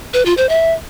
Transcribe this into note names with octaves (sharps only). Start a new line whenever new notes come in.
B4
F4
C5
E5